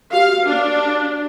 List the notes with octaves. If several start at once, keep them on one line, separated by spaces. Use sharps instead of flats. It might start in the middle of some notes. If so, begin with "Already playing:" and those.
F#4 G4 F5
D4